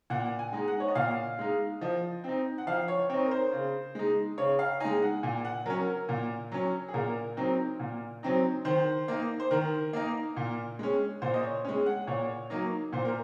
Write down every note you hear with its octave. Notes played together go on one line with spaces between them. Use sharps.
A#2 F#5
G#5
G#3 D#4
F#5
C#5
D#5
A#2 F5
G#3 D#4
F3 D#5
C4 D#4
F#5
F3 F5
C#5
C4 D#4 C#5
A#4
C5
C#3
G#3 D#4
C#3 C#5
F5
G#3 D#4 G#5
F#5
A#2 G#5
F#5
F#3 C#4 A#4
A#4
A#2
F#3 C#4
G#4
A#2 A#4
F#3 C4 D#4
A#2
F#3 C4 D#4
D#3 C5
A#3 D#4
C5
D#3 A#4
A#3 D#4
A#2
G#3 C#4
A#2 C5
D#5
C#5
G#3 C#4
F#5
A#2 C#5
F#3 A#3 D#4
A#2 C5
A#4